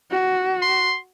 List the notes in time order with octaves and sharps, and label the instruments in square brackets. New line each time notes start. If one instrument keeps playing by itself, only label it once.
[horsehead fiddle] F#4
[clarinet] C6